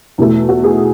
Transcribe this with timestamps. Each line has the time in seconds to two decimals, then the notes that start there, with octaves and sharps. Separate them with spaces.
0.18 E2 B2 A3
0.49 F#4
0.64 G#4